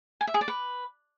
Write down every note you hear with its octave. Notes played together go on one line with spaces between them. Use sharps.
G#5
E5
G#4
D5
B4